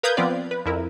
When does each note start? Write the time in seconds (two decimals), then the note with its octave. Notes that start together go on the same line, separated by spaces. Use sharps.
0.03 A#4 B4 F5 D#6 G6 G#6
0.17 F3 B3 C4 F4 B4 D5
0.51 B4
0.66 F2 E4 A#4